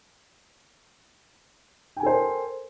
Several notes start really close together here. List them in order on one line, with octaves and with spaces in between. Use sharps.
G5 G#5 A4 C5 A#4